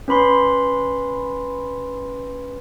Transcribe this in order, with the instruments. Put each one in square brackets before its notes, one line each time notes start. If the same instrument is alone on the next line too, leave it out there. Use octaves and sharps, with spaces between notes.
[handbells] C#4 B4 B5 C6